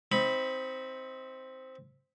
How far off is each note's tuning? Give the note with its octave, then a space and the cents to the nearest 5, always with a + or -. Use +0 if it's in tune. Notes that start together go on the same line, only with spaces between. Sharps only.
C4 +0 D#4 +30 B5 +0